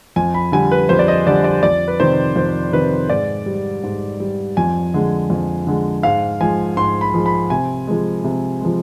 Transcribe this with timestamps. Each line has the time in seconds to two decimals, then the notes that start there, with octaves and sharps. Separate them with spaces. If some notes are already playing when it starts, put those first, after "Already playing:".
0.16 F2 G#5
0.34 B5
0.52 D3 G3 G#5
0.72 B4
0.89 F2 C5
0.99 D5
1.08 D#5
1.27 D3 G3 D5
1.44 D5
1.63 F2 D5
1.88 B4
2.00 C3 D#3 C5
2.36 F2 C5
2.73 C3 D#3 B4
3.10 G#2 D5
3.46 G3
3.83 G#2
4.20 G3
4.57 F2 G#5
4.94 D3 G#3
5.30 F2
5.67 D3 G#3
6.03 G#2 F5
6.41 F3 G#3 G#5
6.77 G#2 C6
7.01 B5
7.14 F3 G#3
7.26 B5
7.50 C3 G#5
7.87 F3 G#3
8.24 C3
8.61 F3 G#3